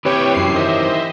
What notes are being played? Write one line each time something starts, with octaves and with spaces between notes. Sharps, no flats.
C3 E3 G4 B4 C#5 G5
F#2 C7
D#3 C5 D#5 E5